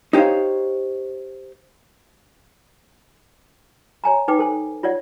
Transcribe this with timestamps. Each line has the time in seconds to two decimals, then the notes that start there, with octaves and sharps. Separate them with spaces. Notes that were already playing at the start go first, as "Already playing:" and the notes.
0.13 D#4 G4 C5 C#5 F5
4.04 C#5 G#5 A#5
4.28 D#4 B4 G5 D6
4.39 A4 C5 G#5
4.83 F4 C#5 D5 F#5